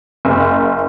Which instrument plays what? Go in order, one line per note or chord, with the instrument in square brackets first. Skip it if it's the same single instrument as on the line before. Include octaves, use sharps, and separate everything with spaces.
[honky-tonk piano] F#1